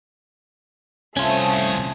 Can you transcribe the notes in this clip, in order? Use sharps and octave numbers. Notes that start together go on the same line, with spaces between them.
C2 A3 C#4 F4 C5 G#5 D#6